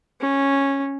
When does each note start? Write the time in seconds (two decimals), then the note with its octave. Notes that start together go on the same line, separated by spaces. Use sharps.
0.21 C#4